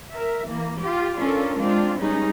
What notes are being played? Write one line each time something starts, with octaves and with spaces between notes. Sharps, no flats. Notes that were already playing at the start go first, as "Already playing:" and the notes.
A#4 E5
E3 A#3
F4 G4
C#4 D4 F4 A4 A#4
G#3 C4 D4 F4
G3 G#3 B3 C#4 D#4 G#4